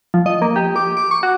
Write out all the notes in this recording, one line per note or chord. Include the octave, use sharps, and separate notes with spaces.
F3
D#5
A#3
G4
D6
D6
C#6
F#4